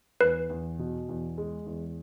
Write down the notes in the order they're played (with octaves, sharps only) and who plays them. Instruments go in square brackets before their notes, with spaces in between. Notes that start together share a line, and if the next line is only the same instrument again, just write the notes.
[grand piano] E2 [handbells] B4
[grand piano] E2
B2
E2
G#3
E2